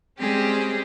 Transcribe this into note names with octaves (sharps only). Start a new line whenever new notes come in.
G3 G#3 C4 C#4 G4 G#4